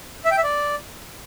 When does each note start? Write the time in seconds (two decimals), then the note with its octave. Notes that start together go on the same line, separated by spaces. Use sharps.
0.25 E5
0.31 G5
0.37 E5
0.44 D5